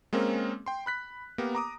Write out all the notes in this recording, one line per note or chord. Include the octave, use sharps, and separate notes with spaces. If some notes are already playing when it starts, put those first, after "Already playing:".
G#3 A#3 C4 C#4 A#4
G5 C6
B5 F#6 B6
A#3 B3 G4 A#4
A#5 D6 D#6